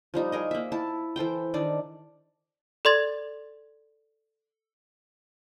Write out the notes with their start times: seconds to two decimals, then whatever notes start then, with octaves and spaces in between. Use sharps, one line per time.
0.14 F3 G3 D#4
0.32 G#4 A#4 D#5
0.51 A#3 E5
0.72 E4 A5
1.16 E3 A4 C5 G5
1.54 D#3 D4 D5
2.85 A4 D5 C6 G#6 A6